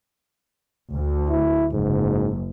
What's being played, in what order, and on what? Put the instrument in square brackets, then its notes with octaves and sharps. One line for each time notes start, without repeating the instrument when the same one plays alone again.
[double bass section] D2
[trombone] E4
[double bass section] F#1 [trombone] G#2